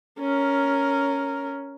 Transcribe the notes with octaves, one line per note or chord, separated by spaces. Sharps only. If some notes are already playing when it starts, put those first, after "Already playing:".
C#4 A#4